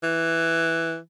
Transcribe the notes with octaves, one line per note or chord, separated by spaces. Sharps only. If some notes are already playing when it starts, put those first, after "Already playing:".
E3